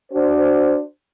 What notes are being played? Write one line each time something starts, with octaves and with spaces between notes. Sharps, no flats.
D4 F#4 C5